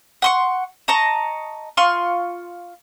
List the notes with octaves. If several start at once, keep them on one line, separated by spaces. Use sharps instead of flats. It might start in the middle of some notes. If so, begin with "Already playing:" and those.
F#5 C6 C#6
D#5 A5 A#5 C#6
F4 C6 C#6